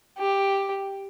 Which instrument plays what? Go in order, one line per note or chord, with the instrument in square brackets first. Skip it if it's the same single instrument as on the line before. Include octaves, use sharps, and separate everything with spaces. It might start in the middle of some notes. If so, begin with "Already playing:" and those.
[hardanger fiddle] G4